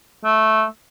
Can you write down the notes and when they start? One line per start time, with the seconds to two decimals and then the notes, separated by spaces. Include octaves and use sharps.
0.25 A3